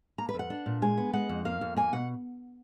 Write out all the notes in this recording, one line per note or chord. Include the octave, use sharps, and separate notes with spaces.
A#3 A#5
B4
F2
F#5
D4
A#2
G#3 G#5
B3
G#3 F#5
F2
A#3 F5
F2
A#3 G#5
B2 F#5